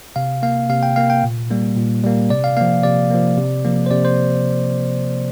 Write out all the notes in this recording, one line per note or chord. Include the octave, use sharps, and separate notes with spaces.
C3 F5
A#3 F5
C3 F5
G5
A#3 F5
G5
A#2
G3 A#3
A#2
G3 A#3
C3 D5
F5
F3 A#3 F5
C3 D5
F3 A#3
C3
F3 A#3
C5
C3 D5
C5